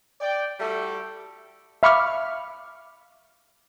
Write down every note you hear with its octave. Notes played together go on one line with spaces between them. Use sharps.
D5 G5
G3 A3 E4 F#4 G4 A4
E5 F5 B5 C#6 D6 F6